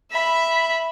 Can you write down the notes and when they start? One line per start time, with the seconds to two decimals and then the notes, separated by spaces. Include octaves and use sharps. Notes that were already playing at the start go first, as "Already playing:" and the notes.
0.11 E5 B5